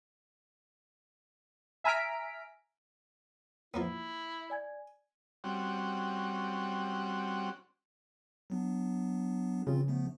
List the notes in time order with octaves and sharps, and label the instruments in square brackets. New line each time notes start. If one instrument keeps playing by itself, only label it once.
[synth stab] E5 G#5 A#5 F6 B6 D7
[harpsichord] F3 A#3 B3 [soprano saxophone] E4
[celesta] D5 G#5 G#6
[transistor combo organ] G3 C4 C#4 F#4
[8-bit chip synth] F#3 B3 D4
[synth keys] C#3 [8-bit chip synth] E3 C4 F4
[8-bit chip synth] F3 A3 B3